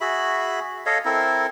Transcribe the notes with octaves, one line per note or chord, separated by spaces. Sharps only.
F#4 G#4 E5 B5
A4 C#5 D#5 F5
C4 E4 A4 A#4